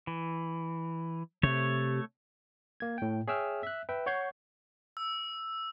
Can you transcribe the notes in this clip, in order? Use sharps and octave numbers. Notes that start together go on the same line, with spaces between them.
E3
C3 A3 C#5
A#3 G#6
A2 G5
G#4 C#5 E5 G5 E6 F6
E5 F#6
B4 E5 G5
C#5 F#5 C#6 G6 G#6 C7
E6